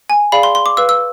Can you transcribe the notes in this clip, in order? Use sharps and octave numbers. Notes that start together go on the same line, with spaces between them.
G#5
G#4 D5 F5 B5
C6
C6
D6
B4 F5 E6
E6